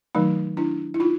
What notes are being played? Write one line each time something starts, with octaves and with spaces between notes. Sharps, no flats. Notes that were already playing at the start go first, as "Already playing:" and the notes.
D#3 F#3 A3 D#4
D4 E4
E4
D#4 F4